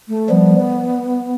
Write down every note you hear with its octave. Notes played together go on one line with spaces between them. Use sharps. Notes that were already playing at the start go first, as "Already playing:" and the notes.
A3
F3 G3 B3